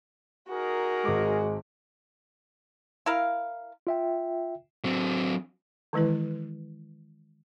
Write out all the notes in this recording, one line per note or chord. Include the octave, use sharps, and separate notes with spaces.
D#4 F#4 G#4 A#4
G#1 G#3 D6
E4 A#4 F5
F4 E5 G5
F#3 C4
D#3 E3 G#3 E4 B4